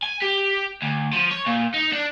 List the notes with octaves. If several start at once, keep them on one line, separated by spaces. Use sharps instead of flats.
G#5
G4
D2
F3
C#5
A#2
D#4
D4